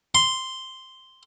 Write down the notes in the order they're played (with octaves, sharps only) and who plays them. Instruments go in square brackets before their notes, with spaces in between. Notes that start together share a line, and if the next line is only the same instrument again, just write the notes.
[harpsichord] C6